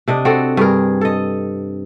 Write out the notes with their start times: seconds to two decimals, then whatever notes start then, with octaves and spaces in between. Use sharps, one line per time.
0.08 C3 D4 D#5
0.25 C4 F#4 A4
0.57 G2 G#4 A#4
1.01 A4 D#5